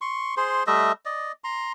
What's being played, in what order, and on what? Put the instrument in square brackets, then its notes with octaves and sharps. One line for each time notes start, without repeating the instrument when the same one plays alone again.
[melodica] C6 C#6
G#4 C5 C6
G3 A3 D#5 E5
D5 D#5
A#5 C6